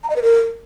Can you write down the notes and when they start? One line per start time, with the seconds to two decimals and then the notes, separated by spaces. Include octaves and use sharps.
0.03 A#5
0.10 D#5
0.16 B4
0.22 A#4